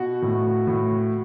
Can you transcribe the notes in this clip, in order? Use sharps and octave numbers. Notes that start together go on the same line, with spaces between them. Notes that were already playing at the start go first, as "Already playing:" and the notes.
Already playing: B2 F#4
A2
A2